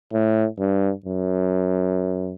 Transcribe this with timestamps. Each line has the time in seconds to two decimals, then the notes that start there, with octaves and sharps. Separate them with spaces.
0.14 A2
0.59 G2
1.06 F#2